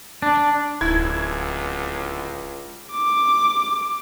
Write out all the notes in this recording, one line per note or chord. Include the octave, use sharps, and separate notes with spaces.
D4
D1 C#2 E4 G#6
D6